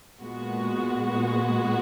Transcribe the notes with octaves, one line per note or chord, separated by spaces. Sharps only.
A#2 G#3 B3 F#4